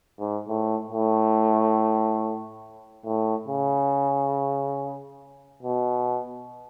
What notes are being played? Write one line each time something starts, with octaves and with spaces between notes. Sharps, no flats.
G#2
A2
A2
A2
C#3
B2